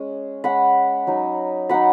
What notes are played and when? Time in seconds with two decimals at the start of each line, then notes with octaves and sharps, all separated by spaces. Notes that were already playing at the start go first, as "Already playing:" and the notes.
Already playing: G#3 C#4
0.44 G#3 C#4 F#5 B5
1.07 F#3 D#4
1.69 F#3 D#4 F#5 B5